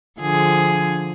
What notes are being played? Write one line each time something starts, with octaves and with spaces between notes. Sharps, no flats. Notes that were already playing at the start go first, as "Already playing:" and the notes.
D3 F3 G#4